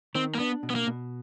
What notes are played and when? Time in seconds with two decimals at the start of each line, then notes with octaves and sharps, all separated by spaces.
0.15 D#3 C4
0.35 A#3
0.39 B3 D4
0.63 B2
0.70 B3
0.75 A#3
0.87 B2